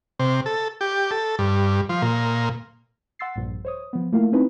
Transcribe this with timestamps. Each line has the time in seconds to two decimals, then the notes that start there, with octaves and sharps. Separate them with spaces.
0.19 C3
0.46 A4
0.81 G4
1.11 A4
1.39 G2
1.89 F3
2.02 A#2
3.19 F#5 C6 E6 A6 C7
3.36 A#1 G2 A#2 F3
3.65 C5 C#5 D#6
3.93 F3 B3
4.12 A3 A#3 E4 F4 A#4 F5
4.32 C4 C#4 D#4 E4 B4